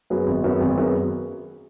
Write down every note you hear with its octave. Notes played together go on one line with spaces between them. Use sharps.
F#2 F#3 B3 G#4
G#1
F#2 F#3 B3 G#4
G#1
F#2 F#3 B3 G#4